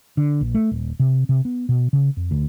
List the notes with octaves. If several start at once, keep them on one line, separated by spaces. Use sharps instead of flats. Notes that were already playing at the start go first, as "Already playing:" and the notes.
D3
A#1
A3
D#1
C3
C3
B3
B2
C#3
F2
D2